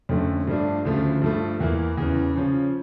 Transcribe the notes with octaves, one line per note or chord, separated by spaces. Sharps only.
F2 D3 A3 C#4
G2 F3 A3 D4
D2 C#3 F3 A3
G2 F3 A3
E2 E3 A#3 E4
E2 C#3 E3
C#3 F3 C#4